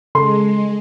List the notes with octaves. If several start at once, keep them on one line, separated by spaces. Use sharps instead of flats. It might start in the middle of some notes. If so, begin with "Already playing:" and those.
C#3 G#3 A4 C6